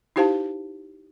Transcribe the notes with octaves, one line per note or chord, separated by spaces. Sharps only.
D#4 E4 G4 C5 F5 A5